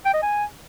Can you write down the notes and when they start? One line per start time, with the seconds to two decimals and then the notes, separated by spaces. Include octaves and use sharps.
0.06 G5
0.14 D#5
0.23 G#5